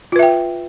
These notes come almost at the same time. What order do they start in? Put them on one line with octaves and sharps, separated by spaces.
F4 B4 E5 G5